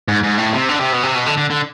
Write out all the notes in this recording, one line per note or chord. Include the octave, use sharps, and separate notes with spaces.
G#2
G#2
A2
C3
D3
C3
B2
C3
B2
D3
D3
D3